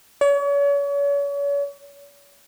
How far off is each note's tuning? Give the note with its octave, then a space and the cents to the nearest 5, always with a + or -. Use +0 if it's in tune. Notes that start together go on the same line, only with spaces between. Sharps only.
C#5 +40